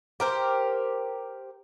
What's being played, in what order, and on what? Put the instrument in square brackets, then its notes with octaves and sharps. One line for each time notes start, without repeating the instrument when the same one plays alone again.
[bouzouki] G4 A#4 C5